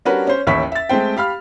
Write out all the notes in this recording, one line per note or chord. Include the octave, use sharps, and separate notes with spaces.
G3 C#4 D4 F#4 A#4 B4
C#4 C5
A1 D#2 E5 B5 C#6 B6
E5 A6
G#3 A3 C4 C5 G5
G4 F5 B5 F6